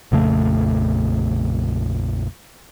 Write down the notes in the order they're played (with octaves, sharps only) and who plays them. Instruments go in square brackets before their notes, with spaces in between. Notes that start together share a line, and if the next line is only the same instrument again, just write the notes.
[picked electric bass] A#1 F2 C#3 A3